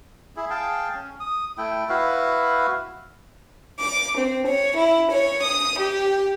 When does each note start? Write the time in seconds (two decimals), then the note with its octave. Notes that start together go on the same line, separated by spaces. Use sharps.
0.36 E4 G#4
0.50 G#4 F5 G5 A5
0.94 C#4
1.20 D#6
1.58 A3 E4 G5
1.89 E4 F#4 B4 F5
3.80 D6
4.18 C4
4.47 C#5
4.77 E4
5.11 C#5
5.43 D#6
5.79 G4